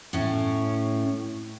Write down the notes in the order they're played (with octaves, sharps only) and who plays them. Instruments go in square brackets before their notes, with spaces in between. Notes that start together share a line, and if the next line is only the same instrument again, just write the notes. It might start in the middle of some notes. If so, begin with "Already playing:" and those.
[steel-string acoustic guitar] A2 C#4